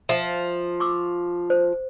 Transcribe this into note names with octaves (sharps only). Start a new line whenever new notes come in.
F3 E5
C#6 D6 E6
C5